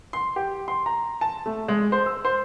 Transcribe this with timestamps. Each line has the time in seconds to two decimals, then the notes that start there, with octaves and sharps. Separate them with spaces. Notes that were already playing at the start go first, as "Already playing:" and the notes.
0.13 C6
0.36 G4
0.68 C6
0.86 A#5
1.21 A5
1.46 A3
1.68 G#3
1.92 C5
2.06 E6
2.25 C5